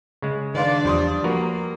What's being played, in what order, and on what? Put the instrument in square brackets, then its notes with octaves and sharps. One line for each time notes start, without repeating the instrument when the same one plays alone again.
[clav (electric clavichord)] C#3 G#3
[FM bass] D#3 [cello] D4 D5 [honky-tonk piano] B4 F5 C6
[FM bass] E2 [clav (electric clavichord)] F3 [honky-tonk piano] G3 C6 D#6
[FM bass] F3 [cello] A#3 [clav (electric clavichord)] F#4 A#4 B4